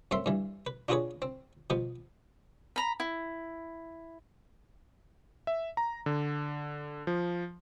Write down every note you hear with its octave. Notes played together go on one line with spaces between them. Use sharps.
F#2 A3 C4 E5 C6
G2 E3
B4
D4 F4 F#4 G#4 B4 C#5
C4
B2 F3 B3
A#5 B5
E4
E5
A#5
D3
F3